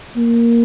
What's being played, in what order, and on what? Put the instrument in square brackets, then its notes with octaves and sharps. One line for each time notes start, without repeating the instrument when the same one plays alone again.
[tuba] A#3